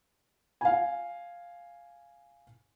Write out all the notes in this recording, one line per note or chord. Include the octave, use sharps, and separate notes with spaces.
F5 G#5